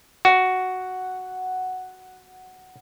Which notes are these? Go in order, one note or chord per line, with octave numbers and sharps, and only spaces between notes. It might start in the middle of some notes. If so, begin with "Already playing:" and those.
F#4 F#5